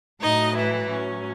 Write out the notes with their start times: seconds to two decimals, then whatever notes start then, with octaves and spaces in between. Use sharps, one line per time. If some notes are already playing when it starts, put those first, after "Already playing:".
0.21 A2 F#3 D#4 D#5
0.55 E3 E4
0.89 A2 F#3 C#4